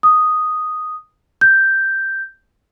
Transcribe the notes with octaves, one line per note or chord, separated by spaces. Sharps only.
D#6
G6